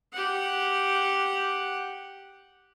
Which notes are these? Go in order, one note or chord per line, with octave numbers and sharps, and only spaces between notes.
G4 F#5